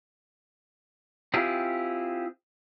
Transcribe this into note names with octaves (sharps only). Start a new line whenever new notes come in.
C4 E4 F4 G4 G#4